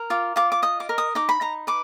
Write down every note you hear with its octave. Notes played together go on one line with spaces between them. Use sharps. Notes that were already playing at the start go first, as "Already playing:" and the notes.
Already playing: A#4
F4 D6
F4 D6
D6
D#5 D#6
D6
A#4
D#6
D#4 D6
B5
D#4 A#5
B4 D6